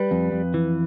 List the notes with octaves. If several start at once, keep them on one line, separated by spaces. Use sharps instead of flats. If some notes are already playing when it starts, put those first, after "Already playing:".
Already playing: G3 B4
F2
F2
E3